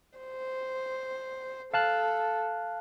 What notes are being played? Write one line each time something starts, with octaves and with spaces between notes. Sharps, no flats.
C5
A4 F5 A5 F#6